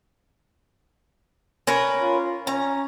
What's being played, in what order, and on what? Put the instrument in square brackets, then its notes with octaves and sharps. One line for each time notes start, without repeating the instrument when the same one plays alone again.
[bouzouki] C#4 A#4 B4
[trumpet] F4
[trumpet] C#4 [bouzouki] A#5